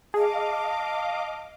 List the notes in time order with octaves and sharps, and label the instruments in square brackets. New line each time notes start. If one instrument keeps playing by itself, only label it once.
[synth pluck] G#4 [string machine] D#5 F5 D6 [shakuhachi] A5